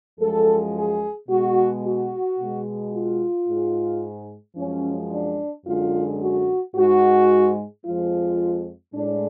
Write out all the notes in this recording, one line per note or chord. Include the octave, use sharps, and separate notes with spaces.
F#2 F3 G#3 A4
G#4
B2 G#3 F#4
F#4
B2 G#3
F4
G#2 G#3
F#2 F3 G#3 C#4
D4
F#2 D3 G#3 F4
F#4
G#2 G#3 F#4
F2 F3 G#3 F4
A2 G#3 D4